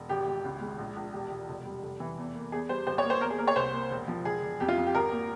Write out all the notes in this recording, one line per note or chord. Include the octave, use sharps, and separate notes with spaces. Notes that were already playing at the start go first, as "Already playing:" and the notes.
Already playing: E1
G#1 G4
G#1
C#2
G#3
A#1
A#1
E1 G4
E1
F1
G3
F1
E3
E2
A#3
E2 G#4
G3 C5
G#1 C5
C#5
A#3
C5
E2 A#4
G#4
A#3 A#4
C#5
C2 C5
A#3
E1
F3
E1 G#4
E1
F2 G4
F4
F2
G4
G#1 A#4
A#3